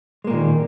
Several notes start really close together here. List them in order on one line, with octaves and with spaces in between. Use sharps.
G#3 A#3 A#2 D#3